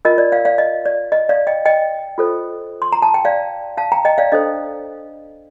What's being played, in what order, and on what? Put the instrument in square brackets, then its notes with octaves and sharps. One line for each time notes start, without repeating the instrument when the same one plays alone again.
[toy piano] F4 A#4 D#5
D5
D5 F5
D5 F5
D#5
D5
D#5
D5 F5
D#5 G5
D#5 G5
F4 A4 C5
C6
A#5
A5
G5
D5 F5
F5 A5
G5 A#5
D#5 G5
D5 F5
D4 A4 C5 D#5